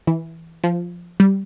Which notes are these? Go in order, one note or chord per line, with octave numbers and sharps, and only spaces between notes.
E3
F3
G3